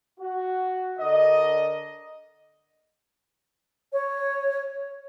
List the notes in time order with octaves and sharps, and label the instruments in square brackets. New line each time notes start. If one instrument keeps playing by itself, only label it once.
[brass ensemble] F#4
D3 A#4 D5 D#5
[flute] C#5